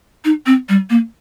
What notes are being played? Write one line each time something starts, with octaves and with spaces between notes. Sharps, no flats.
D#4
C4
G3
A#3